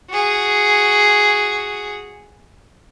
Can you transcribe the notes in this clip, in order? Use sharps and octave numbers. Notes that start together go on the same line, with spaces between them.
F#4 G#4